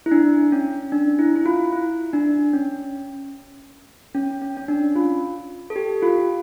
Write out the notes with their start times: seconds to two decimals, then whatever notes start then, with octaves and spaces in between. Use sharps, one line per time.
0.06 E4
0.11 D4
0.52 C#4
0.92 D4
1.19 E4
1.36 E4
1.46 F4
1.73 E4
2.13 D4
2.53 C#4
4.15 C#4
4.42 C#4
4.57 C#4
4.68 D4
4.96 F4
5.70 A4
5.76 G4
6.02 F4